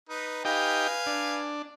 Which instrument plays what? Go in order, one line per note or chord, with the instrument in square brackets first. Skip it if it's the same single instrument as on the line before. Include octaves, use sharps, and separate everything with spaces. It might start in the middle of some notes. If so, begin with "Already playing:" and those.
[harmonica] D#4 B4
[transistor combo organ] D#4 G4 G5 [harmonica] B4 F5 G#5
[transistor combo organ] D4